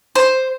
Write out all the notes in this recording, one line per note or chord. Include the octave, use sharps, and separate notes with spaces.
C5